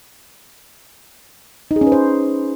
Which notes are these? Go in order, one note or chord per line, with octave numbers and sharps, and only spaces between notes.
D#4
G#4
C#4
B4
C5